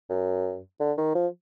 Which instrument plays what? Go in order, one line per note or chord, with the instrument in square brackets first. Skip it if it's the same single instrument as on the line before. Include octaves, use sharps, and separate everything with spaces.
[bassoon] F#2
D3
D#3
F3